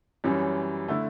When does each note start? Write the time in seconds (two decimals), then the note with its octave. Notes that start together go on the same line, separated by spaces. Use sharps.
0.24 F#2 E3 G3 C#4
0.88 D3 A3 E4